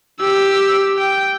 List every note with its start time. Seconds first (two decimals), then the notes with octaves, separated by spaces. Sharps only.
0.20 G4 E6
0.98 G5